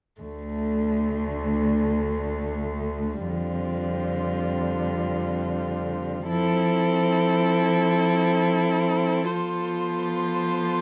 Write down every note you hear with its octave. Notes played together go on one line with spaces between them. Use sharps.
D2 D3 A3
F2 D3 G3 C4 F4
F3 C4 E4 A4
F3 B3 F4 A4 C5